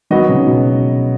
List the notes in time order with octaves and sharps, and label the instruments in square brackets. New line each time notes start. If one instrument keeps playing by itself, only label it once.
[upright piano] D#3 [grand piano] F#3 B3 F#4 D#5
[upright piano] C#3
B2